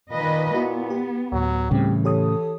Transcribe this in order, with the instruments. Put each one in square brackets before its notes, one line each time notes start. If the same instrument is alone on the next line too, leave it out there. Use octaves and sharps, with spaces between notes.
[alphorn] A#2 [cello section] D#3 B4 D#5
[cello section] B3 [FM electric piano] E4 F#4
[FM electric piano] G4
[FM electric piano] D2 A2 [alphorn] F#3
[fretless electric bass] A2 C#3 [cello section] E3 [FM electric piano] G3 C4 [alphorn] G4
[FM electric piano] G4 C#5 D#6 [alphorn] A4